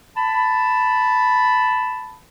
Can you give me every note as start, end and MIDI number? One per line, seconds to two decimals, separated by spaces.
0.17 2.18 81
0.17 2.18 83